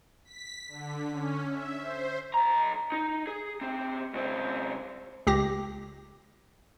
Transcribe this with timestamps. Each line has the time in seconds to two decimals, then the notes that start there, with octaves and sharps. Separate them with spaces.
0.25 B6
0.68 D3
1.11 C#4
1.49 E5
1.79 C5
2.34 B1 A#5
2.92 D#4
3.27 G#4
3.61 B2 C4
4.13 C#2 C4
5.27 C#2 G4 A#6